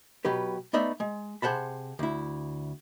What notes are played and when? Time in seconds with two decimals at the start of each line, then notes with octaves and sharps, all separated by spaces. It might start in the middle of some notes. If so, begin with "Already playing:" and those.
0.25 B2 F#3 G4 B4
0.73 A3 B3 D#4 D5 E5
1.00 G#3
1.42 C3 G#4 C5 F#5 A5 B5
1.99 D2 E4